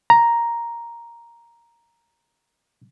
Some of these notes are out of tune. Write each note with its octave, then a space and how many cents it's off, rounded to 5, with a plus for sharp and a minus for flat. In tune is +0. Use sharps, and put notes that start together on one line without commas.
A#5 +5